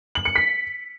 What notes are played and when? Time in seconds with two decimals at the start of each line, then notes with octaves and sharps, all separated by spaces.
0.15 F#7
0.25 C#7
0.36 B6